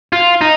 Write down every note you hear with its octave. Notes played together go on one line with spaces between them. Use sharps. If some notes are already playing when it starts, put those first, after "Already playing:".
F4
D#4